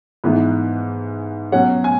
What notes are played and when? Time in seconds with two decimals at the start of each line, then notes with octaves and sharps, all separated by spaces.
0.24 G#2 E3 B3 D#4
1.52 B2 F#3 C#4 F#5
1.84 G#5